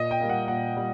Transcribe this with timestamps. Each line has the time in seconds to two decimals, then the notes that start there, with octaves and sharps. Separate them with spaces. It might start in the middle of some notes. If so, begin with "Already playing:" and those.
Already playing: A#2 D#5
0.11 G5
0.20 G3 A#3
0.29 F#5
0.48 A#2 F#5
0.77 G3